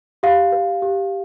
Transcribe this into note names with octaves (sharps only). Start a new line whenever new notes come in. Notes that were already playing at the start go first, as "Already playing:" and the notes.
G4 F5
B4
G4